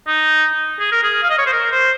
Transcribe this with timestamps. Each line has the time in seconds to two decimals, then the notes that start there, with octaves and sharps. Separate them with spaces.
0.07 D#4
0.79 G#4
0.92 A#4
1.03 G#4
1.23 F5
1.30 D#5
1.38 C#5
1.46 C5
1.53 A#4
1.72 C5